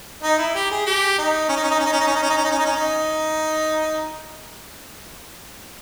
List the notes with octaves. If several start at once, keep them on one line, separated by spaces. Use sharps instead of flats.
D#4
E4
G4
G#4
G4
D#4
C#4
D#4
C#4
D#4
C#4
D#4
C#4
D#4
C#4
D#4
C#4
D#4
C#4
D#4
C#4
D#4
C#4
D#4